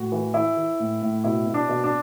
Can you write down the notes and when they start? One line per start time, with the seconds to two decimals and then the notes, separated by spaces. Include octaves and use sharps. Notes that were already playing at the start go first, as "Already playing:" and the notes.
Already playing: A2 F#4
0.12 E3
0.34 E3 E4
0.57 E3
0.80 A2
1.02 A2
1.24 B2 E4
1.46 B2
1.54 D4
1.69 B2
1.84 D4